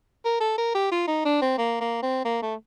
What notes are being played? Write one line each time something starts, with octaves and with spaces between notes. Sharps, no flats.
A#4
A4
A#4
G4
F4
D#4
D4
C4
A#3
A#3
C4
A#3
A3